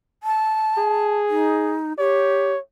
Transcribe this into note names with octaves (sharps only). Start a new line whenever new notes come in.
A5
G#4
D#4
G4 C#5